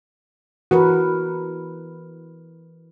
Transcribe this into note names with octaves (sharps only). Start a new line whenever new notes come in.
E3 F#4 A#4 B4